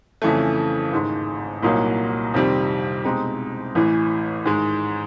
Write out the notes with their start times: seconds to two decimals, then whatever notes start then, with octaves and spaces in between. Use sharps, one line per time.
0.22 F2 C#3 E3 A3
0.92 A1 G#2 D#3 G#3
1.63 C2 A#2 F#3 A#3 D#4
2.34 F2 C3 D#3 G3 C4
3.04 B2 G#3 C4 D#4 G4
3.75 A1 A2 E3
4.45 G#2 D#3 G#3